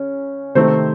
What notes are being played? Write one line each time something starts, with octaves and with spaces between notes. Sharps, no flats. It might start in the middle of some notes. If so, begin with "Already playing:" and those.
Already playing: C#3 C#4
C3 D#3 A3 C4 C5